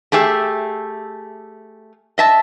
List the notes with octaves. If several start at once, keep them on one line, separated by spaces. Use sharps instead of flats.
A3 G4 G#4 E5
D#5 E5 A5